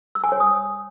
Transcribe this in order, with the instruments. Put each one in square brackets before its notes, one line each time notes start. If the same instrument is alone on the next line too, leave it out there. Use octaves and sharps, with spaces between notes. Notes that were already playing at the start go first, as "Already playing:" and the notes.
[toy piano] E6
G#5
C#5
D#6